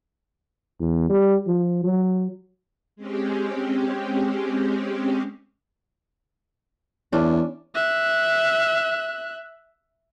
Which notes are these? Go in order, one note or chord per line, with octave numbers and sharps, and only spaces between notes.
E2
G3
F3
F#3
G#3 C4 C#4 G4
E2 C#4 D4
E5 F#6